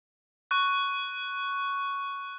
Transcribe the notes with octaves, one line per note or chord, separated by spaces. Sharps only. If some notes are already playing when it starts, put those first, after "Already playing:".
C#6 F#6